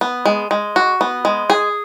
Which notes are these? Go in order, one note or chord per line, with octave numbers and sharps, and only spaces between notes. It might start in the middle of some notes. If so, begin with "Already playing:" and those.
B3
G#3
G#3
F#4
B3
G#3
G#4